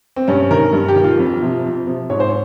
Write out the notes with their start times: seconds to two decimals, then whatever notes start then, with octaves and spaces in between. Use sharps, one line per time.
0.16 C4
0.28 G2 C#4
0.51 D#3 A#4
0.73 G2
0.88 G4
0.96 D#3
1.04 F4
1.19 F2
1.42 C3 F3
1.65 F2
1.87 C3 F3
2.10 G#2 C#5
2.20 C5
2.29 C#5